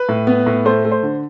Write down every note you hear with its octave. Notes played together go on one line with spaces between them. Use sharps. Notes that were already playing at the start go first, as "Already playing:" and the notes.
Already playing: B4
A2
B3
A2
A3 C5
A3
C5
D3